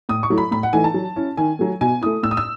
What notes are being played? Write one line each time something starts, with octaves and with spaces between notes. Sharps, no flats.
A2 D#6
C#6
F#3 A3 E4
B5
A2 B5
F#5
E3 A3 D#4 G#5
A5
F#3
C#4 E4
D#3 G#5
F#3 A3
B2 G#5
A3 E4 D#6
A2 E6
D#6
E6